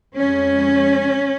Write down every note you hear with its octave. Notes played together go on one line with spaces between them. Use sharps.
F2 C#3 G#3 C#4